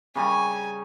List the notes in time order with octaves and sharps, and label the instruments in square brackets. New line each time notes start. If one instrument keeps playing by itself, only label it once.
[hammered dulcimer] C#3 G3 A#5 [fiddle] G#5